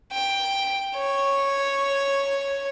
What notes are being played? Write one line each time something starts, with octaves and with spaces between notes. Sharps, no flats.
G5
C#5